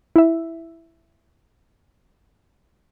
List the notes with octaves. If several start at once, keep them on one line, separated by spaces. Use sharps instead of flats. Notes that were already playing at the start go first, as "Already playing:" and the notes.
E4 E5